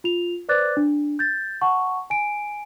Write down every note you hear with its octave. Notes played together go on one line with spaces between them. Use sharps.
F4 F7
B4 C5 D5 D6 F#6 A6
D4
G6 A6
F#5 A5 C#6
G#5 D7